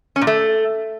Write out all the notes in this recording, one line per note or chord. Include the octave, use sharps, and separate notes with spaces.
C#4
A#2
A3